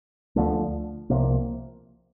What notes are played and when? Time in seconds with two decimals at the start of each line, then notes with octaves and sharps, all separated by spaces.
0.36 D2 D3 F3 A3
1.10 C2 C3 F3 A#3